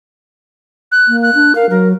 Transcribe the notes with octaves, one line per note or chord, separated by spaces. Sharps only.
F#6
A#3
F#6
D4
A#4 F5
F#3 A#4